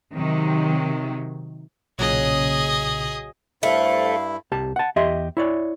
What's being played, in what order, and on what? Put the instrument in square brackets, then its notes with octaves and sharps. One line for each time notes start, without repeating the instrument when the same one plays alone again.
[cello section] C3 D#3 F#3
[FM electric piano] B1 A#2 C#3 [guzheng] F#3 [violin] G#4 D#5
[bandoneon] G2 E4 [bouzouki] A3 [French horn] C5 [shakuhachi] F5
[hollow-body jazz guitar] C2 G4 A5
F#5 A5
E2 G4 D#5 E5 C6
E4 C#5 D5